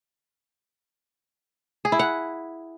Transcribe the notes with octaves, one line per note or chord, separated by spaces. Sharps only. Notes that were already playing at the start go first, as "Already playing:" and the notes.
G#4
E4
F#5